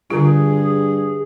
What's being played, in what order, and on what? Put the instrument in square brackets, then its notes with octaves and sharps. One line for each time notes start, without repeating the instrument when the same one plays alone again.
[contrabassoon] G2 [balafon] D3 F4 [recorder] G#4